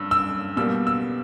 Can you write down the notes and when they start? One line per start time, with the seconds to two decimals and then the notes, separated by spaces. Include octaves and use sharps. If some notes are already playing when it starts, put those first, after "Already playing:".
Already playing: G2 E6
0.11 E6
0.57 B2 G3 A#3 E6
0.87 E6